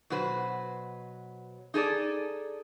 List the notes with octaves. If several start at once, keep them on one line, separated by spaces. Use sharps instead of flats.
B2 F#3 F#4 B4 C5
D#4 G#4 A4 D5